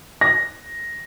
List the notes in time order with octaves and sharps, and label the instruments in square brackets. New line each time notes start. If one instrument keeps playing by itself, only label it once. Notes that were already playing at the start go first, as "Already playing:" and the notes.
[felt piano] A#6